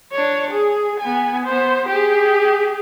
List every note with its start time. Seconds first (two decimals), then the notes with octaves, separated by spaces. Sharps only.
0.12 D4 C#5
0.51 G#4
1.00 B3 G#5
1.45 B3 C5
1.89 G4 G#4